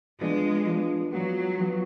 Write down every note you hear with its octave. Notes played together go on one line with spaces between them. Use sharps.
F3 G#3 B3 D4
F3 B3 D4
F3 F#3 B3 F#4
F3 B3 F#4